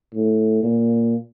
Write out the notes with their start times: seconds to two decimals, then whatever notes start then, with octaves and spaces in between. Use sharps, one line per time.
0.14 A2
0.63 A#2